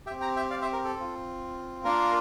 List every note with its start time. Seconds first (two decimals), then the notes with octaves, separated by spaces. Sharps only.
0.06 G4 E5 G5
0.11 C4
0.21 G5 A#5
0.36 E5 G5
0.50 D5 F5
0.61 C5 E5
0.73 A#4
0.85 A4
0.95 C4 F4
1.84 A#3 D4 F4 A#4